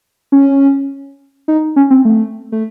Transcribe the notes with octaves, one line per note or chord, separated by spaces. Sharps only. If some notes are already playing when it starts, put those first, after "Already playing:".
C#4
D#4
C#4
C4
A3
A3